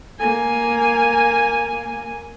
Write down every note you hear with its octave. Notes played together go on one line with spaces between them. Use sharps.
A#3 G#5